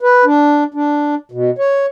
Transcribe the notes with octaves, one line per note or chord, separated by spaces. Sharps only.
B4
D4
D4
B2
C#5